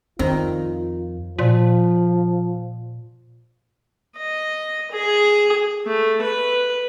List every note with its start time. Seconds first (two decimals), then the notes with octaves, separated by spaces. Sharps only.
0.19 F2 D#3 C4 F4
1.39 A#2 F3
4.17 D#5
4.92 G#4
5.86 A3
6.22 B4